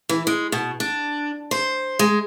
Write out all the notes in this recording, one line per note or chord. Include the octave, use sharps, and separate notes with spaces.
E3
G#3
B2
D4
C5
G#3